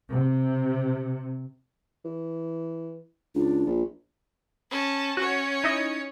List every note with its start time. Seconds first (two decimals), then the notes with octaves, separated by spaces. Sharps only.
0.13 C3
2.05 E3
3.35 C#2 D4
3.66 A#1
4.71 C#4 A5
5.17 C#4 F#4 C#5
5.64 D#4 E4 D#5